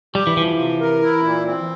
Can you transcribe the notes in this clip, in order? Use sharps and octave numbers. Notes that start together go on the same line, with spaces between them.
G3 G4
E3
E3 F3
C3
A#4
E4
A#2
C4